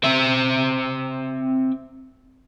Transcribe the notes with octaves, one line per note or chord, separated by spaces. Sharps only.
C4 E5